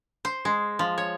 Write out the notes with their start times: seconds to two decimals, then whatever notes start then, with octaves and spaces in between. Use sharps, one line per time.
0.25 C5
0.45 G#3
0.79 F3
0.98 C#5